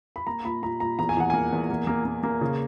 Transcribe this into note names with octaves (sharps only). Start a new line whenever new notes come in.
B5
A#3 A#5
A#2 B5
A#2 A#5
A#2 A#5
E2 A#5
G#5
E2 F#5
A#3 G#5
E2
A#3
A#3
A#3
A#3
C#3